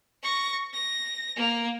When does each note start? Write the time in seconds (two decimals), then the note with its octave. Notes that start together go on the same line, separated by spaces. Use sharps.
0.23 C#6 A#6
0.74 A#6
1.36 A#3